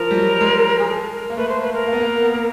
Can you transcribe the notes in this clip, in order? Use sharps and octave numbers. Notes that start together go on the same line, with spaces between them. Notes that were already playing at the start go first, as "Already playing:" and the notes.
Already playing: F3 A#4
G3
F#3
G#3
G#4
A4
A#4
A#3
A3 B4
C5
B4
A#4
A#3
B3
A#3
B3
A#3